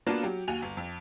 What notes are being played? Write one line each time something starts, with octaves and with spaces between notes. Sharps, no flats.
A#3 B3 D4 F4 F#4 A5
F#3 G4
D#2 F#4 G#5 F7
G1
F2